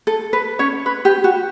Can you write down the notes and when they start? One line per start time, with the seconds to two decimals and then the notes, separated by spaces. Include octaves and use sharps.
0.07 A4
0.33 B4
0.59 C#4 C#5
0.86 B4
1.05 G4
1.24 F#4